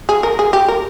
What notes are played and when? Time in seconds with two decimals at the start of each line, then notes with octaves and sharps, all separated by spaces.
0.09 G#4
0.23 A#4
0.39 G#4
0.53 G4
0.68 A#4